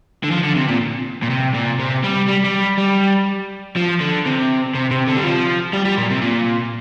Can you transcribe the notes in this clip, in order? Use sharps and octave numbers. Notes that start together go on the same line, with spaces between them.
D3
F3
D3
C3
A#2
A#2
C3
A#2
C3
G3
G3
G3
G3
F3
D3
C3
C3
C3
D3
G3
F3
G3
G3
A#2
C3
A#2